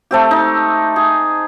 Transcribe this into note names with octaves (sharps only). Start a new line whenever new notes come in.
A3 C4 G4
D#4
G#4